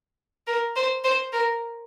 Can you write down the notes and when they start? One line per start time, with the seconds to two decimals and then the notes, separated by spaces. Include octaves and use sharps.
0.47 A#4
0.76 C5
1.04 C5
1.33 A#4